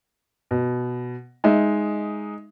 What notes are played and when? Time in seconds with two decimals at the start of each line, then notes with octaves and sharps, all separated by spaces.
0.51 B2
1.44 G#3 D#4 E5